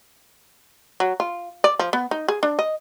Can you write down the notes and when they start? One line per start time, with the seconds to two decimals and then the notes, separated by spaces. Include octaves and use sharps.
1.00 F#3
1.20 F4
1.64 D5
1.79 F3
1.93 B3
2.11 D#4
2.28 G#4
2.43 D4
2.59 D#5